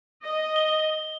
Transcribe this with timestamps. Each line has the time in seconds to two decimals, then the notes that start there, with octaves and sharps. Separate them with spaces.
0.24 D#5
0.56 G7